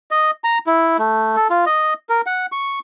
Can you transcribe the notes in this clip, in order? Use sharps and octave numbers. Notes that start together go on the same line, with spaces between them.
D#5
A#5
E4
A3
A4
F4
D#5
A#4
F#5
C#6